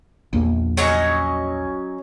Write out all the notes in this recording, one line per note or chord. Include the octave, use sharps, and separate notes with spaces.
A#1 E2 A#3
F#3 C#4 D#5